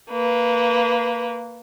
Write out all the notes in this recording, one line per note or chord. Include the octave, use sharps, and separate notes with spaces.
A#3 B4